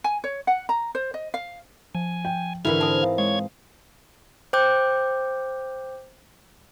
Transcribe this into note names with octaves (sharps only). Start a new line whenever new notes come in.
G#5
C#5
F#5
A#5
C5
D#5
F5
F3 G#5
G5
G#2 D3 E3 E4 A#4 B5 F6 G#6
C4 A5 D#6
F5
G#3 C#5 F5 G#6
C5 G5 D6 G6